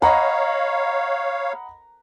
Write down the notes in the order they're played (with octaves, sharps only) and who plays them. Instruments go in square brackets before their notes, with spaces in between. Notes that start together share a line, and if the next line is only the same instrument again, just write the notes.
[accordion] C#5 F5 [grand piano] D#5 F#5 B5 [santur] A#5